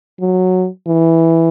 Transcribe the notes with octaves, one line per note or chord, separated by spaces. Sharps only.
F#3
E3